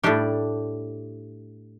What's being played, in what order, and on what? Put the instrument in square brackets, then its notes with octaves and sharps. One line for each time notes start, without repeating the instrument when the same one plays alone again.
[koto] A2 G3 D4 G4